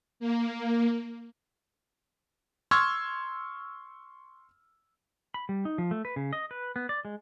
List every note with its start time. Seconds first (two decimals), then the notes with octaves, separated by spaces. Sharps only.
0.20 A#3
2.71 C6 C#6 E6 F6 G#6
5.34 B5
5.49 G3
5.65 D#4
5.78 F3
5.91 A3
6.05 B4
6.16 C#3
6.33 D#5
6.51 B4
6.76 B3
6.89 D5
7.05 G#3